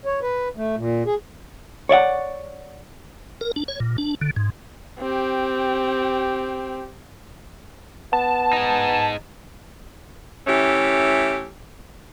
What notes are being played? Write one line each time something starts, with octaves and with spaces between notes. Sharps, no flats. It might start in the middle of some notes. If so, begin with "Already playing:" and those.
C#5
B4
A3
A#2
G#4
C#5 D5 E5 F#5
A#4
D4
C#5
A#2
D4
D3
G#2
C4 G4
B3 A5
D#4 G#4
E3 A3 C#4 G4